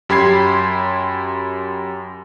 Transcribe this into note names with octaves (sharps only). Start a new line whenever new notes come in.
F#2 G4 B5 C6 G#6 C7